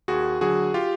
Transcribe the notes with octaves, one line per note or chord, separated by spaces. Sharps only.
D#2 F#4 G#4
D3 F#3 F#4 G#4
F4 G4